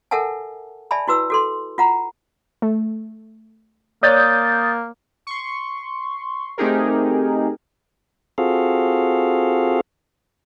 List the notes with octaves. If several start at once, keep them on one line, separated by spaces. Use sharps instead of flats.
A4 A#4 E5 F#5 G#5 A5
D5 E5 G#5 A5 B5
E4 F#4 B4 E6
F#4 A4 C6
F4 F#5 A#5
A3
A#3 C#5 D5 D#6 F#6 G6 A6
C6 C#6
A3 C4 D#4 G4 G#4 A#4
C4 F4 F#4 G#4 A4 F5